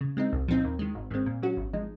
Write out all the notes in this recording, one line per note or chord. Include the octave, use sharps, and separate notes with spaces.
C#3
G#3 C4 D#4
C2
A#2 F3 C4 D#4
D#2
D#3 G#3
G#1
G#2 D#3 G#3 C4
A#2
F#3 C#4 F#4
G#1
F3 G#3 D#4